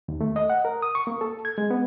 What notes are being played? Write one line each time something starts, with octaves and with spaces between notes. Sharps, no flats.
D#2
A3
D#5
F#5
A#4
D#6
C#6
A#3
A4
G#6
G#3
B3